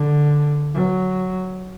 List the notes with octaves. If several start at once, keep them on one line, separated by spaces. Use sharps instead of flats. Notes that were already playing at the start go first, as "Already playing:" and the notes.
Already playing: D3
F#3